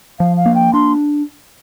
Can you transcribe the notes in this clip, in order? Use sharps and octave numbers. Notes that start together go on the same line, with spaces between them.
F3 F5
F5
A#3
G5
D4 C6